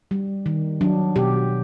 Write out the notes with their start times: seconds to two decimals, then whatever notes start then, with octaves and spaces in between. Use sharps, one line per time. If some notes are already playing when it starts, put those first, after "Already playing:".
0.11 G3
0.46 D#3
0.81 F#3 D4
1.16 B2 G4